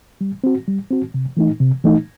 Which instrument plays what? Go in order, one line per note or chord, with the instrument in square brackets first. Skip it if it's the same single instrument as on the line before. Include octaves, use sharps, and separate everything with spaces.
[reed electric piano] G3
C4 F#4
G3
C4 F#4
C3
E3 A3 D#4
C3
E3 A3 D#4